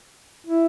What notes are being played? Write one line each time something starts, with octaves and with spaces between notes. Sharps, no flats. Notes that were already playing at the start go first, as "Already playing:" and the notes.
E4